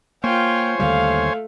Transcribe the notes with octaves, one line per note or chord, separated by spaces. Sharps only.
A#3 F4 C5 C#5 G5 G#5
D#2 D3 G3 A3 F5